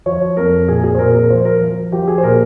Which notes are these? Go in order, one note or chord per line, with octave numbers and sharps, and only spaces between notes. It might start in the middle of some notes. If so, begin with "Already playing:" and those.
F3 C#5
F2 A#4
A#2 G#4
G#4
C5
A#2 A#4
A#4
F3 C5
A#4
F3
F3 G4
G#4
C5
A#2 A#4